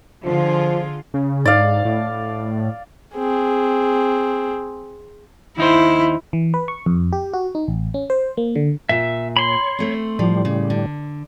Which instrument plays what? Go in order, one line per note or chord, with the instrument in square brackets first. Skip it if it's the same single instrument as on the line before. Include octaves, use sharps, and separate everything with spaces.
[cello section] D3 F4 G#4 [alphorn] F3
[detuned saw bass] C#3
[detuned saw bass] G#2 [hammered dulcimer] D5 F5
[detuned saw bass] A2
[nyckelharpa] C4 G#4
[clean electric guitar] D#2 D#4 C5 [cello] E4
[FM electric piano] E3
B4
C#6
F2
G4
F#4
D#4
A1
C#4
C5
A#3
D3
[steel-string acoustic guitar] A#2 [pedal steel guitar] E5
[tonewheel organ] C#5 [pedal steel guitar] B5 C6
[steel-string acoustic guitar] A3 C4
[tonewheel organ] A2 G3 [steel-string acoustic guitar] F3
[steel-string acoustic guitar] C#3
D3